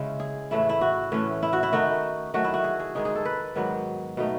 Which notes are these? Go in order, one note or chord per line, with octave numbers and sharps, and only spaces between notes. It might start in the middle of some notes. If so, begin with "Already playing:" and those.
Already playing: C#3 G#3 C#4 E4
G#4
A2 E3 A3 E4
E4
F#4
A2 E3 A3 C#4
E4
F#4
E4
D#3 A3 D#4 F#4
D#3 F#3 A3 F#4
E4
F#4
G#4
G#4
G#2 D#3 G#3 D#4 G#4
G#4
A4
B4
G#2 D#3 F#3 B3
B2 A3 D#4